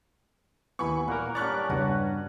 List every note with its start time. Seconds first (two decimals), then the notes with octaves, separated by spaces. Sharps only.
0.79 D#2 E3 B3 G#5 B5 C#6
1.08 A#2 A#3 A#4 F#5
1.35 G3 C#4 D4 D5 A#5 C#6 F#6
1.69 E2 G2 C#3 F#4 B4 F#5